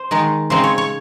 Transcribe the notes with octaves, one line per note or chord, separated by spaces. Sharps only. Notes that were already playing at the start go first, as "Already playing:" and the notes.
Already playing: C5
D#3 G#3 D#4
C#3 G#3 C4 D#4 C5
C#5
C#5